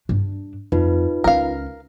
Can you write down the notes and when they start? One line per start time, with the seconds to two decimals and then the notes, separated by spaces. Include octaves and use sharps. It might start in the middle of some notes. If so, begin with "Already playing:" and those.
0.09 G2 D4
0.72 F2 D#4 F4 B4
1.24 C#2 C#4 A#4 F5